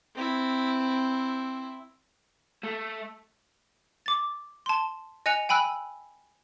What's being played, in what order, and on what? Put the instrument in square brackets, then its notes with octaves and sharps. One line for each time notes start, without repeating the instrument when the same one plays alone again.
[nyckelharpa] C4 E4
[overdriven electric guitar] A3
[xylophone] D6 A6
A5 C6
D#5 G#5 F#6 C#7 F7
G5 G#5 B5 E6 F#6